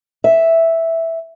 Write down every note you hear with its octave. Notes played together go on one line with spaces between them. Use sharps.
E5